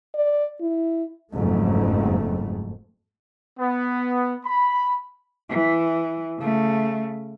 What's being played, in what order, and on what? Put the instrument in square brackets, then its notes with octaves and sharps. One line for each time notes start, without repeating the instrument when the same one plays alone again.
[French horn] D5
E4
[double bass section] F#1 F2 G#2 A3
[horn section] B3
B5
[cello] E3
C#3 A3